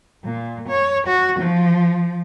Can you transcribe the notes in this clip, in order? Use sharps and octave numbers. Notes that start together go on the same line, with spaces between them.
A#2
C#5
F#4
F3